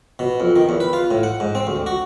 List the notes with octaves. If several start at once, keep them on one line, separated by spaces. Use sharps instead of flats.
B2
F2
D#3
E2
B4
F4
A2
F#5
G#2
C4
D2
F#4